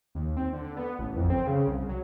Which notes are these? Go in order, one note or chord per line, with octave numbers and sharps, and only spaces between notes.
D#2
C4
D3
B3
A1
F2
C4
C#3
C2
F#3